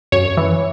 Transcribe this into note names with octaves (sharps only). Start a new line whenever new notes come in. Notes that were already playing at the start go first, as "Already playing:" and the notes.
F#2 C#5
E3